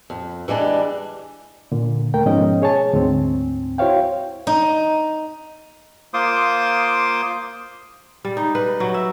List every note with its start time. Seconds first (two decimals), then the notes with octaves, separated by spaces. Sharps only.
0.10 F2
0.48 E3 G3 G#3 D4
1.72 A#2 D3
2.14 D#2 A3 A#4 G5
2.26 G#2 B2 F3 C#4 D#5
2.62 G#4 C#5 G#5 A5
2.93 D2 G#2 C4
3.78 E4 F#4 C5 C#5 F5 G5
4.47 D#4
6.14 A#3 F4 C5 C6 D6 D#6
8.25 G3
8.37 D#4
8.55 B4
8.80 F#3
8.94 E5